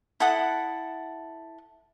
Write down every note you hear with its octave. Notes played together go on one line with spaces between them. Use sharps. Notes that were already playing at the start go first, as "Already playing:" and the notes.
E4 A4 F#5 D#6